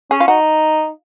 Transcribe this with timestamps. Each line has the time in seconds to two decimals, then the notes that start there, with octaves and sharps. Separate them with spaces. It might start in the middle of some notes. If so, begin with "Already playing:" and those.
0.11 C#4 G#4
0.20 F4
0.28 D#4 F#4